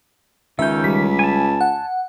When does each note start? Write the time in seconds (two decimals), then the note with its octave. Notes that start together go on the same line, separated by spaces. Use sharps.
0.59 C#2 D#3 C#4 E5 G6
0.84 G3 B6
1.19 G#5 A5
1.61 F#5